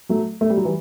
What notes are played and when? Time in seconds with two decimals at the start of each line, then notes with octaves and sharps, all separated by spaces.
0.09 F#3 A3
0.41 A3
0.50 G3
0.57 F#3
0.65 E3 G3